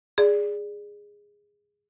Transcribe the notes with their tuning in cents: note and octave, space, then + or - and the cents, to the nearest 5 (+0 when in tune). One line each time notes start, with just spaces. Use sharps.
G#4 -10 D5 +0